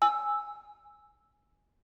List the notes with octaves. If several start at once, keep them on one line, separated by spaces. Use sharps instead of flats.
G#5 E6